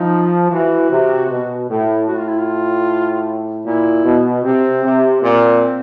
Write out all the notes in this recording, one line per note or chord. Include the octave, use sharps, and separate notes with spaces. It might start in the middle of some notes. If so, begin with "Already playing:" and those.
Already playing: F3 D#4
E3 F#4
C3
B2
A2
A2 F#4
F4
E4
F4
A#2 E4
B2
C3 C4
C3
A#2 C4